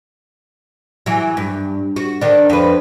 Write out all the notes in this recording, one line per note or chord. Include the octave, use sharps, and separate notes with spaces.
E3 F#3
G2
F#4
D#3 D4
F2 B4